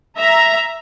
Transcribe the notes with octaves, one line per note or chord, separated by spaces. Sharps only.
E5 A#5